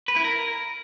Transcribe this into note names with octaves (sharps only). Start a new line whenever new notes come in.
B4
E4
A#4